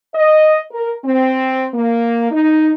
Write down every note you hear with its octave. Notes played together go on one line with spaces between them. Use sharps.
D#5
A#4
C4
A#3
D#4